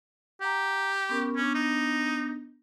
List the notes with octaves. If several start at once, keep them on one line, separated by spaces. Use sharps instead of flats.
G4 F#5 A#5
B3 C#4 A#4
B3 C#4 D4
D#4